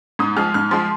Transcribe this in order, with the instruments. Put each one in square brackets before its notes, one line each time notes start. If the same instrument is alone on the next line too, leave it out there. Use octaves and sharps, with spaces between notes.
[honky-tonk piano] G#2 D#6
F3 G#3 F6
G#2 F6
F3 G#3 C6